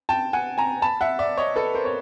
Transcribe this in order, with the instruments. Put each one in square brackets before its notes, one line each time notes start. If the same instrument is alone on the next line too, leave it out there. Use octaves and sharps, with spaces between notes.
[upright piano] G5 A5
F#5 G#5
G#5 A#5
A5 B5
E5 F#5
D5 E5
C#5 D#5
A4 B4
A#4 C5
C#5